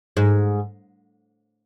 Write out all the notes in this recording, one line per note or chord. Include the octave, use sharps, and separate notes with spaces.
G#2